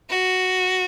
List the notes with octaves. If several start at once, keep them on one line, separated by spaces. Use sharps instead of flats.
F#4